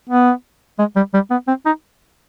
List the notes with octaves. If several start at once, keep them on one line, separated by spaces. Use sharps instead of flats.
B3
G#3
G3
G3
B3
C4
D#4